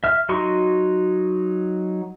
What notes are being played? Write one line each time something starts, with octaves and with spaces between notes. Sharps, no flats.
E5 F6
F#3 D#4 F#4 C6 C#6